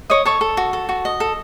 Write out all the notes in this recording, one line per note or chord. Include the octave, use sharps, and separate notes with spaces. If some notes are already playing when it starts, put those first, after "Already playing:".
C#5 D#5 D#6
A4 C#5 C#6
A4
F#4
A4
F#4
D#5
A4